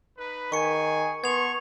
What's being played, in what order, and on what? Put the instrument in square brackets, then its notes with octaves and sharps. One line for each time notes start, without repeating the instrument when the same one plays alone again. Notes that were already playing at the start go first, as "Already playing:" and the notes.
[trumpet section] D#4 B4
[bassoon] D#3 [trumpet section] G#4 G#5 [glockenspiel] C#6 C#7
[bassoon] B3 [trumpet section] A5 C6 C#6 [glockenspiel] G#6 F7